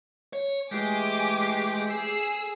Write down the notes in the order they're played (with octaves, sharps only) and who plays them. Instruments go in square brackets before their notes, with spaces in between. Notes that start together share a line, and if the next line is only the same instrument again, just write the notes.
[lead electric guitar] C#5
[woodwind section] E3 A3 G4 [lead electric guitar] G#3 [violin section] G#5 D6
[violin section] G#4 E6 C7